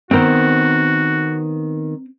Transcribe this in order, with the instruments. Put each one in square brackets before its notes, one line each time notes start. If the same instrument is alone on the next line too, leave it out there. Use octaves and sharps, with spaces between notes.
[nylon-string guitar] D#3 B3 [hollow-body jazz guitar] C4 A#4 C5 [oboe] F#4